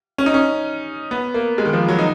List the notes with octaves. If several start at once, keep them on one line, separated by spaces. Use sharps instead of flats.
C#4
D#4
C#4
B3
A#3
G#3
D#3
F3
F#3
D#4